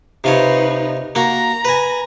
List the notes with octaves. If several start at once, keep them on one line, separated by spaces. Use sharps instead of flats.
C3 D#4 F4 B4 C#5
A#3 F#4 A#5
B4 G#5